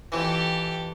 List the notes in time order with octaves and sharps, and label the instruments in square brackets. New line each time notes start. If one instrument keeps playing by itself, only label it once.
[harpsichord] F2 E3 [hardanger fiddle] G4 A4